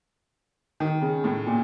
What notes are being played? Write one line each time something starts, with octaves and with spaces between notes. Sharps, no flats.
D#3
C#3
A2
A#2